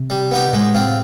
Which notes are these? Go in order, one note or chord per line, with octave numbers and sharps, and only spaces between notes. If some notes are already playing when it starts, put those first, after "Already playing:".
Already playing: C3
G3
B3 D#4 G4
A2 G#3
C4 F4